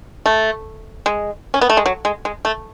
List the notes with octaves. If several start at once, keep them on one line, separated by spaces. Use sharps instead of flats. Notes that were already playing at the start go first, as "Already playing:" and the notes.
A3
G#3
C#4
B3
A3
G#3
F#3
G#3
G#3
A3